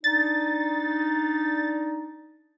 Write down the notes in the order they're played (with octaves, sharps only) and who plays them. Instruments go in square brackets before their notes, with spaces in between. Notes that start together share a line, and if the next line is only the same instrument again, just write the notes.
[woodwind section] D4 D#4 [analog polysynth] A6